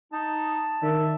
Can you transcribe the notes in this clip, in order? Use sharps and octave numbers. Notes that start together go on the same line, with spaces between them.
D#4 A5
D#3 D5 E5